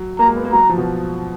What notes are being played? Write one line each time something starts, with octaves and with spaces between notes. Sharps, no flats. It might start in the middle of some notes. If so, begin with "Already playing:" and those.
Already playing: F#3
A#3 A#5
G#3
B3
A#3
F#3 A#5
F3
B2